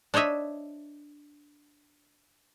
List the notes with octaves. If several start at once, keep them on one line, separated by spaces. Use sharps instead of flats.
D4 C5 C#5 D#5 E5